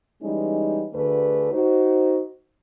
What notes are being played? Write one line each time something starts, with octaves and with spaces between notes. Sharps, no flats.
E3 G3 G#3 C#4 D#4
D2 D3 A3 G#4 B4 D5
D#4 F#4 C5